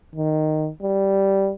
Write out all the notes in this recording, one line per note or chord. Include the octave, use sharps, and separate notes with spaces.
D#3
G3